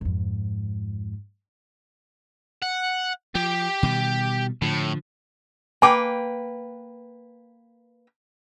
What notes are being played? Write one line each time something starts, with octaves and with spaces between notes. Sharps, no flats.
F2 G#2
F#5
F3 G4
B2 D#3 G3
A2 D3 F3
A#3 B4 G5 G#5 D6